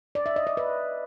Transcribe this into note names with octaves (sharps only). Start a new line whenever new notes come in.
D5
E5
D#5
D5
B4